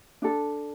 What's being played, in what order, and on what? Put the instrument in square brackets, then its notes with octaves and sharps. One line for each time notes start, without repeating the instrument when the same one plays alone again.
[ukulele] D4 A4